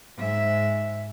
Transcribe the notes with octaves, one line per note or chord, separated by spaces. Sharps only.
G#2 E5